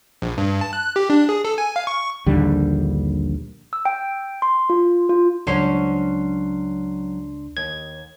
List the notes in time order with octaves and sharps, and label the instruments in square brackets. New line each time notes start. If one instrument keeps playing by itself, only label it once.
[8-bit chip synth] A#1
G2
A5
F#6
G4
D4
G#4
A4
G#5
F5
C#6
[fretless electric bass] A#1 D#2 D3 G3
[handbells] E6
G5
C6
F4
F4
[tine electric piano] C#2 D4 C6 [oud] F#3 C#4 C5
[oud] D#2 [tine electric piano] G#6